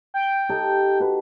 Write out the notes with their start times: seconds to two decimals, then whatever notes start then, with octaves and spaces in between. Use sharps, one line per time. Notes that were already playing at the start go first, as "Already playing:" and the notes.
0.14 G5
0.49 D#4 G4 A4
1.00 F#4 B4